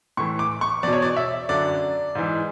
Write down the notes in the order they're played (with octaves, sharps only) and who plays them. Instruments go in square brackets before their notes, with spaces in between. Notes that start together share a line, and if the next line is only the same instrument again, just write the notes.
[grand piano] A2 E3 C#6
D6
C#6
E2 B2 D5
C#5
D5
E5
F#2 D3 D5
G#2 E3